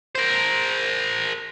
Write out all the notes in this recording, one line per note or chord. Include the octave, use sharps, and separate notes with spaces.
A#4 C5